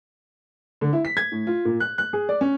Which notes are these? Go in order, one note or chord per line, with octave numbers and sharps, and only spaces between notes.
D3
E4
B6
G#6
A2
F4
A#2
F#6
F#6
G#4
D5
C#4